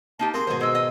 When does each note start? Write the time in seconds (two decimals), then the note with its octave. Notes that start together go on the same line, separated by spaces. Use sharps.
0.19 A#3 D#4 G4 A5
0.34 A#3 C4 G#4 F5 C6
0.47 G#2 B2 D#3 G#4 C5
0.61 G#3 D#5 E6
0.75 D#5